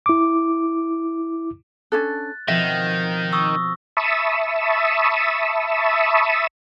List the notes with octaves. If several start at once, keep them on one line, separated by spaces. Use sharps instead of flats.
E4 D6
C#4 D4 A4 F#6 A6
B2 D#3 F3 C4 E5 A#6
C#6 D#6 E6
E5 A5 B5 C#6 D#6 E6